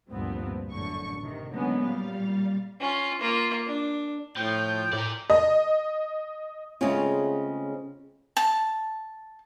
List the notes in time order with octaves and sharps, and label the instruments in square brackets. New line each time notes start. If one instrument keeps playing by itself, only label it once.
[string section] D2 G2 A#2 F3 B3 C4
A1 F#2 D3 C#6
C3 D#3
D3 F#3 G#3 A#3 B3 C#4
A#2 G3 F5
[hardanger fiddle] C#4 F4
A#3 F4
D4
[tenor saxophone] A2 [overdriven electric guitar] F3 [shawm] G5
[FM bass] A2 [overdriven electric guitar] A#4 D5
[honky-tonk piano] D#5
[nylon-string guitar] C#3 G#3 A3 C4 C#4 F4
[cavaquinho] A5